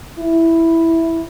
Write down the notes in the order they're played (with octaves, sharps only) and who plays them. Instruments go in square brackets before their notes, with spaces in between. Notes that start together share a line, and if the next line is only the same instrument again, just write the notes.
[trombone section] E4